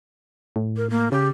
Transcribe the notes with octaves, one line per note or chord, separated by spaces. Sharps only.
A2
A#4
A#3
C#3 G4